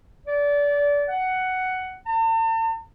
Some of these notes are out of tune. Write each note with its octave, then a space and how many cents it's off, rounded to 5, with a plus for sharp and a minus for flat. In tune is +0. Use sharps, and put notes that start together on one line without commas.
D5 -25
F#5 +10
A5 +45